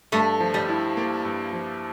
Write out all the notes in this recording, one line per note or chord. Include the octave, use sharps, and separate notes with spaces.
G2 A3
F3
G3
E4
A#3
G2
F3